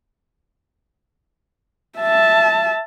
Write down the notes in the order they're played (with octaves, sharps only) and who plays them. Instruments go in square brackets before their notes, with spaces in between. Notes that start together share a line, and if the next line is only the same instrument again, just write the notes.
[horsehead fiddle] E5 A5